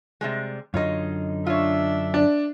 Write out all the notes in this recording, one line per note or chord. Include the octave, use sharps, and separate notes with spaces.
C3 G3 G#3
F#2 D3 D#4 F4 C#5 D#5
D4 F4 C#5 E5
D4